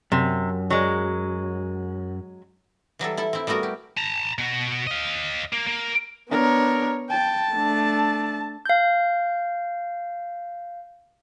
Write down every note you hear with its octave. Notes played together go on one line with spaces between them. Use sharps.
F#2 C3
F#3 G#3
E3 F#3 G3 A4
E4 A4
C4 E4
G3 A3 B3 F#4 A#4
G4
A5 A#5
B2 F#4
D#5 F5
A#3
A#3
B3 D4 A#4 C#5
G5 A5
A3 D4
F5 G6